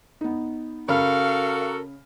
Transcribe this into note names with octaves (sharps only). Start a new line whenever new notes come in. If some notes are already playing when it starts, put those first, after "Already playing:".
B3 D#4
C#3 F#4 A4 A#4 F5 B5 F6